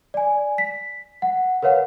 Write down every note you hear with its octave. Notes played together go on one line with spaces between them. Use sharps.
D5 G#5
B6
F#5
A#4 B4 C#5 F5 F#5